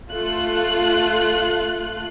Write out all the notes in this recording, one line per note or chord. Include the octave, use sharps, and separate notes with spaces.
A3 F4 F#6